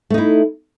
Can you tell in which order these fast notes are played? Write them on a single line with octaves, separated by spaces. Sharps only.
A3 D#4 E4